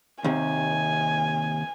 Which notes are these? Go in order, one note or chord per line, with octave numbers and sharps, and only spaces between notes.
D#2 C3 G#5